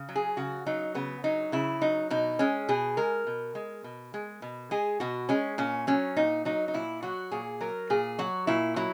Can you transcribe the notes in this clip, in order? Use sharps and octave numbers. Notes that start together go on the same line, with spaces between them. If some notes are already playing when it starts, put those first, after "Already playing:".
Already playing: C#3
F#3
G#4
C#3 F#4
F#3 D#4
C#3 B3
F#3 D#4
C#3 E4
F#3 D#4
B2 D#4
G#3 C#4
B2 G#4
G#3 A#4
B2
G#3
B2
G#3
B2
G#3 G#4
B2 F#4
G#3 C#4
A#2 C#4
F#3 C#4
A#2 D#4
F#3 D#4
D#4
A#2 E4
F#3 F#4
A#2 G#4
F#3 A#4
A#2 G#4
F#3 F#4
A#2 E4
F#3 E4